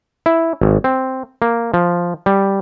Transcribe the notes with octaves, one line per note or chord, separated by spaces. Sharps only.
E4
G#1
C4
A#3
F3
G3